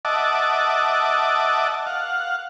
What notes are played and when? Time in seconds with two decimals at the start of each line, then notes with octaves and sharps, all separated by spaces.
0.05 D#5 E5 F#5 A5 D6
1.87 F5 F#5